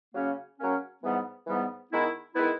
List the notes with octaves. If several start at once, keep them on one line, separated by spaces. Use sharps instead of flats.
C#3 F#3 A#3 C#4
C#3 F#3 A#3 C#4
G#2 E3 G3 B3
G#2 E3 G3 B3
D#3 G#3 B3 E4
D#3 G#3 B3 E4